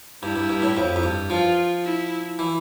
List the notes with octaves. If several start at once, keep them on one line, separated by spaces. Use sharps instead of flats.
G2 E4
G2
G2
A2
F2
F2
G2
F3 F4
E4
E3